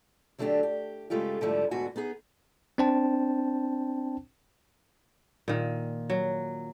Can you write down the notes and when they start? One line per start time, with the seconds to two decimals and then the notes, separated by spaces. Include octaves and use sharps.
0.39 D3 F#3 A3 B3 D4 G4
0.63 G4
1.10 G2 C#3 G#3 A3 F4 G4
1.41 G#2 D3 F3 G3 A3 E4
1.71 D2 G#2 D3 B3 F#4 G#5
1.96 B3 D#4 G#4
2.78 C4 D4 C5 G5 A5
5.48 A#2 D#3
6.10 F#3